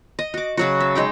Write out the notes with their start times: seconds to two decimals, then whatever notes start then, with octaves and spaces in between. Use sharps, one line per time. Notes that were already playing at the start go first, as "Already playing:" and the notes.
0.19 D#5
0.34 F#4 D6
0.57 C#3 F#3 F#4
0.80 E5
0.95 G#3 D#4 G5